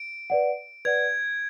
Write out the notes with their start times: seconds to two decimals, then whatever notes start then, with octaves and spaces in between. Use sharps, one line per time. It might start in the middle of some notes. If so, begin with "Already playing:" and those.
Already playing: D7
0.30 B4 D5 F#5
0.85 B4 D5 F#5 G#6